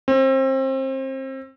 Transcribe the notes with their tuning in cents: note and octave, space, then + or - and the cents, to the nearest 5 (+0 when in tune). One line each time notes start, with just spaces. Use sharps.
C4 +30